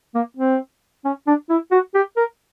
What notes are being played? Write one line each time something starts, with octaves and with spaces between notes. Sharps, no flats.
A#3
C4
C#4
D4
E4
F#4
G4
A#4